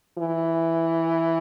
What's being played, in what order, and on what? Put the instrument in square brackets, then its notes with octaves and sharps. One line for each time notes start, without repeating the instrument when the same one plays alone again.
[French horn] E3